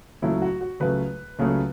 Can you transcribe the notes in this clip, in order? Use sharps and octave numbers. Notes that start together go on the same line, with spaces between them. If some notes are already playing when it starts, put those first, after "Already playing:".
C#2 C#3 F#3 A3 E4
F#4
F#4
C#2 C#3 F#3 A3 B4
C#2 C#3 F#3 A3